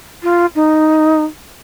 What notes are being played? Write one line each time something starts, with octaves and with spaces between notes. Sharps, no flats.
F4
D#4